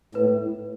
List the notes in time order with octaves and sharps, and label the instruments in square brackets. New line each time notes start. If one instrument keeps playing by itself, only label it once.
[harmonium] A2 [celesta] B4